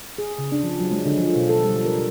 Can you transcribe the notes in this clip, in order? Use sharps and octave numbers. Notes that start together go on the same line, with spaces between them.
G#4
C#3
D4
F3
F#3
G#3
D3
F3
B2
A4
G3
A#4